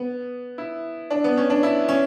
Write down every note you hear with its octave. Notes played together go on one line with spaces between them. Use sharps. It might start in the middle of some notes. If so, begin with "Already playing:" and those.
Already playing: B3
E4
D4
B3
C#4
D4
E4
C#4